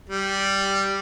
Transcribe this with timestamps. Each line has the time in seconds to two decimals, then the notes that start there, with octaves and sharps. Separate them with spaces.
0.09 G3